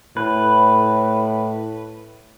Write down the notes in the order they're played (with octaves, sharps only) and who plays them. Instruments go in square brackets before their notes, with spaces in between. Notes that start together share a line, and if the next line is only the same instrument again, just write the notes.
[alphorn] A2 [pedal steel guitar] B4